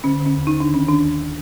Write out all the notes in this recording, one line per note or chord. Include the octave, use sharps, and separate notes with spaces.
D3 C#4
D3
C#4
D#2
D#4
D3
D4
D#3
C#4
D#3 D4
D#2